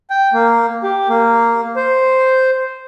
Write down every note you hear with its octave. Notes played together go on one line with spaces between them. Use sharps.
G5
A#3
G4
A#3
C5